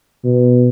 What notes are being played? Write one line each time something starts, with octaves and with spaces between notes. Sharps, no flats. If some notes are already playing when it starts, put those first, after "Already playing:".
B2